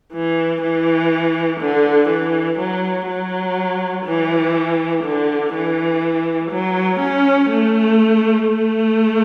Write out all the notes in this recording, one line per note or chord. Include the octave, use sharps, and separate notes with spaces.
E3
E3
D3
E3
F#3
F#3
E3
D3
E3
F#3
C#4
A3
A3